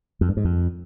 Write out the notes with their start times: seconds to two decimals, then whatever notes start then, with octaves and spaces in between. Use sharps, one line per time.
0.21 F2
0.29 G2
0.37 G#2
0.45 F2